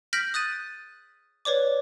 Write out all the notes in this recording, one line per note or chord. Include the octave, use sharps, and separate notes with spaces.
F6 G6 A#6 B6 D7 F#7
D#6 F#6 A6 D#7
B4 C#5 D5 D6